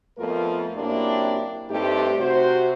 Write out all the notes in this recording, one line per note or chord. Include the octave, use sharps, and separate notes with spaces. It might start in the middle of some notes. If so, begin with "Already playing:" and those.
F2 A3 B3 F4 A4 A#4
F#2 A#3 C4 D4 E4 G4
G2 A3 C4 D#4 G4
C3 F#4 C5